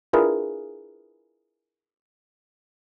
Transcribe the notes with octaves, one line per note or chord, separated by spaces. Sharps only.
D4 E4 F4 G#4 A#4 B4